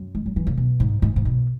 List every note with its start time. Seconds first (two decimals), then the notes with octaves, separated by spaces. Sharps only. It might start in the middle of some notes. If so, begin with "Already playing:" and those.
Already playing: F#2
0.15 G#3
0.26 F#3
0.36 E3
0.47 C#3
0.57 B2
0.80 G#2
1.02 G#2
1.16 G#2
1.25 B2